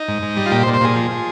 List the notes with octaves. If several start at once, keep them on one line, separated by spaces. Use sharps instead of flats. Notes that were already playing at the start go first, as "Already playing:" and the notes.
Already playing: D#4
G#2
G#2
G3
F4
A#2 G4
C5
A#2
C5
A#2 G#4
F3
F3